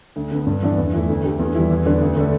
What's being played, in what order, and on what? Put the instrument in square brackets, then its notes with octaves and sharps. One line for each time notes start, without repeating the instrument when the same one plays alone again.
[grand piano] D2
D3 B3
G2
E3 B3 D4
E2
E3 A3 E4
D2
D3 A3 G4
E2
E3 G3 E4
E2
D3 G3 D4 B4
D2
D3 A3 D4 A4